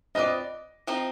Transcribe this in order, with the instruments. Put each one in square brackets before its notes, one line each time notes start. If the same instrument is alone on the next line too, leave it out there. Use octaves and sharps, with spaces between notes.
[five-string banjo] C4 F4 B4 D5 [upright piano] D#5
[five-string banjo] F3 C4 D#4